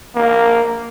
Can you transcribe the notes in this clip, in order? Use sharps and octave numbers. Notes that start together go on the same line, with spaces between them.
A#3